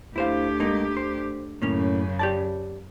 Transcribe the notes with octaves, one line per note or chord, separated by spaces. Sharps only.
D2 E4 G4 C5 F5
G#3 A#3 D#4
C5
F#2 A2 C#3 A#3 C#4
G4 D5 A5